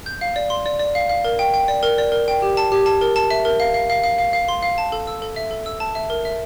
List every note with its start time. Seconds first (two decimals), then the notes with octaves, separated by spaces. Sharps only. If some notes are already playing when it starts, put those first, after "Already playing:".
0.06 G6
0.21 F5
0.36 D5
0.50 C6
0.66 D5
0.79 D5
0.95 F5
1.09 F5
1.25 A#4
1.39 G5
1.54 G5
1.68 D5
1.83 A#4
1.98 D5
2.12 A#4
2.28 G5
2.42 G4
2.57 A5
2.72 G4
2.86 A5
3.01 A#4
3.16 A5
3.31 E5
3.45 A#4
3.60 F5
3.74 F5
3.90 F5
4.04 F5
4.19 F5
4.33 F5
4.48 C6
4.63 F5
4.78 A5
4.92 A4
5.07 E6
5.22 A4
5.36 E5
5.51 A4
5.66 E6
5.80 A5
5.95 E5
6.10 A#4
6.25 E5